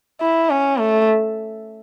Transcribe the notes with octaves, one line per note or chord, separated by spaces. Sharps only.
E4
C#4
A3